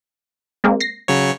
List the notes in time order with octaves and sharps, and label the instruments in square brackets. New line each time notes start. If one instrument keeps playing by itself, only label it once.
[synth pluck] G#3 A#3 C4
A#6 C7
[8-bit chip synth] C#3 F#3 C#5